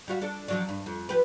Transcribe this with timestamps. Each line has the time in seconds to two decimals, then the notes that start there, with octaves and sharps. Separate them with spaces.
0.08 G3 F#4 F5
0.21 D4 A4
0.48 F3 F#3 D4
0.69 G2
0.86 F2
1.09 F3 G4 B4